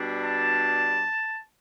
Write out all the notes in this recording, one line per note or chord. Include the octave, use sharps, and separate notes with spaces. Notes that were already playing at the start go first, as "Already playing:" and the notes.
Already playing: B2 G3 D4
A5